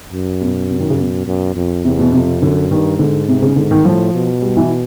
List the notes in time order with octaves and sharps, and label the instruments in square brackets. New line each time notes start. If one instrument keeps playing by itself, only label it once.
[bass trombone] F#2
[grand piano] B2
C3
D#3
C#3
B2
[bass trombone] F#2
F2
[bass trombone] E2 [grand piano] C3
[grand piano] B2
[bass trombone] F2 [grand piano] C3
[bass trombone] F#2 [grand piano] D3
[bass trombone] G2 [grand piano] D#3
[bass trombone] G#2 [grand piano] D3
[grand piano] C3
C#3
[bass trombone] G#2 [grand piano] D3
[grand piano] D#3
[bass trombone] A2 [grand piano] F3
[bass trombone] B2
[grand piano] G3
E3